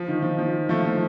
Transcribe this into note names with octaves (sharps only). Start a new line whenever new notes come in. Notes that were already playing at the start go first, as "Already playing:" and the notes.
Already playing: F3
D#3
F3
F3
F3 A3
F3